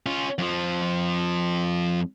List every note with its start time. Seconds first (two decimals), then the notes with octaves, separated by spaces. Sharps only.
0.06 C#4 F4
0.38 F2 F3